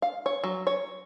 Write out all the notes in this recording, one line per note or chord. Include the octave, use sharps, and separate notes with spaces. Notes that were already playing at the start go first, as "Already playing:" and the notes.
F5
C#5
F#3
C#5